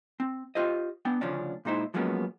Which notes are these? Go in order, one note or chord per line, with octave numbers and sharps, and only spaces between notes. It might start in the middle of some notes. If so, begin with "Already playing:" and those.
C4
F4 G4 C5 D#5
B3 D4 G5
D2 C#3 F3 C#4 D4
A#2 G#3 D#4 E4 C5
F3 F#3 G#3 A#3 B3 C#4